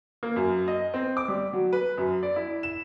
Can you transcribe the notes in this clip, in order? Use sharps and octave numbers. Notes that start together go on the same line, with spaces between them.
A#3
F#2
D#5
C4
D6
G3
F#3
B4
F#2
D5
E4
E7